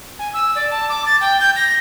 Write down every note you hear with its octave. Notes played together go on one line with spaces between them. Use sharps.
G#5
E6
D5
A5
D6
A6
G5
G6
A#6